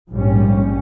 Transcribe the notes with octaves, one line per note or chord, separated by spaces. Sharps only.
A#1 G#2 G3 C#4